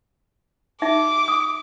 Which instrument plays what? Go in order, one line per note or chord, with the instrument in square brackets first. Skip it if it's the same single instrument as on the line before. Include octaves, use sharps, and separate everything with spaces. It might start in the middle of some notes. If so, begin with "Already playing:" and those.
[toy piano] D#4 E5 [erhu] D6
[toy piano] D#6